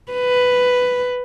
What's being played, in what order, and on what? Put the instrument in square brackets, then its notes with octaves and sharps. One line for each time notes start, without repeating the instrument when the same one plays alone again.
[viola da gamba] B4